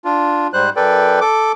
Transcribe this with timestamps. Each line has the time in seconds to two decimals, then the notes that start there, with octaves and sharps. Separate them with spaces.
0.05 D4 F4
0.53 G#2 G3 C5 F#6
0.76 F#2 A4 B4 D5 G5
1.21 A4 D6